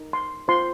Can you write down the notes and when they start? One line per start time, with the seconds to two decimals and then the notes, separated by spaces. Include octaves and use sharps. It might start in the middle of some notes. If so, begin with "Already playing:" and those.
Already playing: D#4 A#4
0.13 C6
0.48 F4 C5 C6